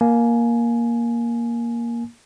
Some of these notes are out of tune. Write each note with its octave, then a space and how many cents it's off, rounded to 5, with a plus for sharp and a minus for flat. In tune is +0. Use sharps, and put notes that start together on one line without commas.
A#3 +5 G#5 +20